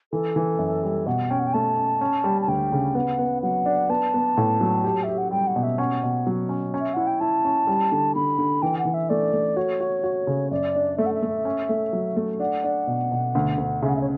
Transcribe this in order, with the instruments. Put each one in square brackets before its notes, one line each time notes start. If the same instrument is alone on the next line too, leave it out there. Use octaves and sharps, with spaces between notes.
[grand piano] E3 [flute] A4
[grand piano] E3
F#2
G3
[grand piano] B2 [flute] F#5
[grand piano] C#4 [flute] G5
[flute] F#5
G5
[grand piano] A3 [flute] A5
[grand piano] C#4
C#4
G3
[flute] A5
[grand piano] D2 [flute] G5
[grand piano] C#3
[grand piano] B3 [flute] F#5
[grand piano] B3
[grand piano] F#3 [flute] F#5
[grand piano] D4
[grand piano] B3 [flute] A5
[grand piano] B3
A2
F#3
G4
[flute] E5
[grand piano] G4
[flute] F#5
[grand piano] G3 [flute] G5
[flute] F#5
[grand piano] B2
[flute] E5
[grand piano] C#4 [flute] F#5
[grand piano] B2
F#3
C#4
C#4
[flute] E5
[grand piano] E4 [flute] F#5
[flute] G5
[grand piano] E4 [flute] A5
[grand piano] C#4
G3
D3
[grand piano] D3 [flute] B5
[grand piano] D3
[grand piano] E3 [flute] G5
[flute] F#5
[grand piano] E3
[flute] E5
[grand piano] A3 [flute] D5
[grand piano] A3
[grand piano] F#4 [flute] C#5
[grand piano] F#4
F#4
C#3
[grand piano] F#2 [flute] D5
[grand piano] D4
[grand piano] A3 [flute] E5
[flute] F#5
E5
[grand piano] A3
C#4
A3
F#3
A3
[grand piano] D4 [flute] F#5
[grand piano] D4
B2
B2
D2
D2
[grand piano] C#3 [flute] E5
[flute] F#5
E5
C#5